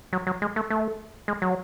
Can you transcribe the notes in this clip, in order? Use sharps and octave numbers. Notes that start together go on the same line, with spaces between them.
F#3
F#3
G#3
A3
A3
G#3
F#3